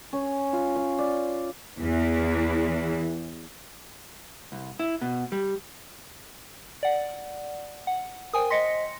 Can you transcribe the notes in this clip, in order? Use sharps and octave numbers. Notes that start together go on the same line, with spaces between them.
C#4
F4
F5
D5
E2 E3
C2
E4
B2
G3
D5 F#5
F#5
A#4 C5 G5 G#5 D#6
C5 D#5 C6 A#6 B6 C#7